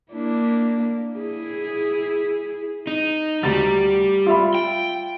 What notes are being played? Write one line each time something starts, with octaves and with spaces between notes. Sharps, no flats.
A#3 D4 E4
E4 G#4
D#4
D2 G3 A#5 A6
F4 E5 B5
G5